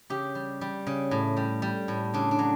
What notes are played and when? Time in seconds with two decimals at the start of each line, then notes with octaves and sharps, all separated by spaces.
0.10 C#3 G4
0.35 G3
0.61 G3
0.87 C#3
1.11 A2
1.37 G3
1.62 G3
1.88 A2
2.14 C#3 D4
2.31 D4
2.39 F#3